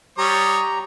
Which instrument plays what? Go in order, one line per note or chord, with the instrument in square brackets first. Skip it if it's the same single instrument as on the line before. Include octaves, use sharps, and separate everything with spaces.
[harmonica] G3 C#5 D#6 [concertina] G4 A#5